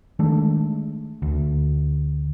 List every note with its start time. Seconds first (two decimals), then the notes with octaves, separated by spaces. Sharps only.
0.19 D#3 G#3 A3 D4
1.22 D2